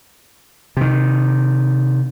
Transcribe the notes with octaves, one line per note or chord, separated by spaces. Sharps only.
C3 D#3